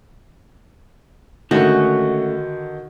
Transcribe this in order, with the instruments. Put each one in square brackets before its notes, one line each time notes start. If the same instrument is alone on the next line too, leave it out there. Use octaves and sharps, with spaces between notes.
[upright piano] D3 D#3 [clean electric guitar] G#3 A3 C#4 [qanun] F#4